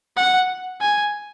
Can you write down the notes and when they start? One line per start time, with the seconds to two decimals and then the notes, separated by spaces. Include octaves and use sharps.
0.17 F#5
0.81 G#5